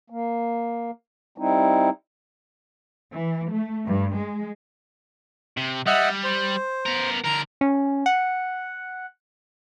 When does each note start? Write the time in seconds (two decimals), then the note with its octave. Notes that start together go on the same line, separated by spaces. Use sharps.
0.10 A#3
1.38 G3 C4 D#4 E4
3.13 E3
3.51 A3
3.86 G2
4.17 G#3
5.57 C3
5.86 G3 D#5 E5 F#5
6.24 C5
6.86 B3 A#4
7.25 D3 A#4 A#5
7.61 C#4
8.06 F#5